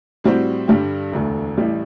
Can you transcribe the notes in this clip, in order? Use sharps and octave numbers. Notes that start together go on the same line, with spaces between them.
A2 G3 C4 F#4 C5
G2 D3 G3 D4 G4
E1 D2 D3 A3
A1 A2 G3